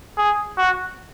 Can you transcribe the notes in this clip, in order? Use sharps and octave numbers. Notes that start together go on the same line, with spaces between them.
G#4
F#4